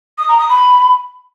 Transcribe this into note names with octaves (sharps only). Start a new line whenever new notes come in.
D#6
A#5
D#6
B5